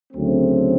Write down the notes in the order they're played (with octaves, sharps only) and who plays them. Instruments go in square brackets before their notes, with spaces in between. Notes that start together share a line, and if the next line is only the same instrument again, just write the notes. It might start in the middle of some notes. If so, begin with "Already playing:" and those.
[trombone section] D2 C#3 F#3 A3 C4